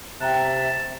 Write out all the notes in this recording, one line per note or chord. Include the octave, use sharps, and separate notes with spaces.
C3 E5 G5 A5 A#5 F#6